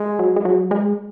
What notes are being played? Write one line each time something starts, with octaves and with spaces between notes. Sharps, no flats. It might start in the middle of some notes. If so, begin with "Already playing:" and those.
Already playing: G#3
F#3
G#3
F#3
G#3